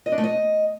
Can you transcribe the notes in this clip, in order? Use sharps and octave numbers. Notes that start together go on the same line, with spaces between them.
D#5
D4
A3
D#5